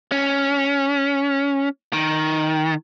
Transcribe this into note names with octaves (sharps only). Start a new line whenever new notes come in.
C#4
D#3